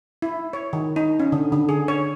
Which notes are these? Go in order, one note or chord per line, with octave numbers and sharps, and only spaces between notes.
E4
C#5
D#3
D#4
C#4
D3
D3
G#4
C#5